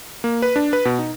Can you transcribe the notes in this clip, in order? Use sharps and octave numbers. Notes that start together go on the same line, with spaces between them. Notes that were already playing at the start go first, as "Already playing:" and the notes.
A#3
B4
D4
B4
B2
D#4